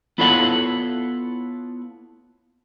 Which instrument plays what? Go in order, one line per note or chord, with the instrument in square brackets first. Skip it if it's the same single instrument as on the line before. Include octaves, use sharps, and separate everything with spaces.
[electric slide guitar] B3 E4 F4 A4 C#5 F#5